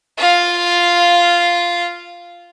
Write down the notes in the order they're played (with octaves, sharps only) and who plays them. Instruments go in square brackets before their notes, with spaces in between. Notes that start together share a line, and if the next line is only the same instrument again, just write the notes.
[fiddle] F4 F5